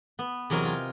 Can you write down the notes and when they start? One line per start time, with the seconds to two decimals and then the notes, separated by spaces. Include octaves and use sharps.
0.19 B3
0.50 E2 C3 F#3 A#4 D#5 G#5
0.65 F4